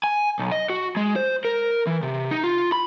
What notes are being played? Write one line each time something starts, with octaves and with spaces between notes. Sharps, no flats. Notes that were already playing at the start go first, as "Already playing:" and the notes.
G#5
B1
D#5
F#4
G#3
C5
A#4
E3
C3
D#4
F4
B5